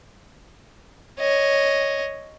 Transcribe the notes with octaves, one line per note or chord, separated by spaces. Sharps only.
C#5 D#5